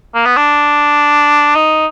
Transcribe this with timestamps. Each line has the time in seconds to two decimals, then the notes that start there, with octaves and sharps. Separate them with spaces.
0.15 A#3
0.26 B3
0.37 D4
1.55 D#4